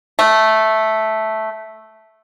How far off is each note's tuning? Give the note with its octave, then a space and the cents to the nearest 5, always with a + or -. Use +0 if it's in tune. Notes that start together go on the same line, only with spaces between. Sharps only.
A3 -5